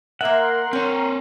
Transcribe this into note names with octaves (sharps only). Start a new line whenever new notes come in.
A#3 A#4 E5 F#5 C6
C4 C#5 G5